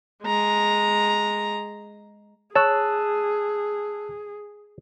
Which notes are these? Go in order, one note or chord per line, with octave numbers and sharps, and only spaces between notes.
G#3 A#5
G#4 C#5 A5 E6 F#6